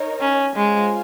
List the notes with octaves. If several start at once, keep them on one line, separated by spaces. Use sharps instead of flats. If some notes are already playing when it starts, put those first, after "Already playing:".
Already playing: D#4 A#4 C#5
C#4
G#3 F4 C5 F5 G#5